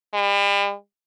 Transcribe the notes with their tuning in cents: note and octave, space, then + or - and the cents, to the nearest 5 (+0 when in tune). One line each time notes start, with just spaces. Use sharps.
G3 +40